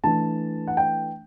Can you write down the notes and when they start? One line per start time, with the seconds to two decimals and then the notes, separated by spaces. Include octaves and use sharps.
0.04 E3 A3 D4 A5
0.68 F#5
0.77 G5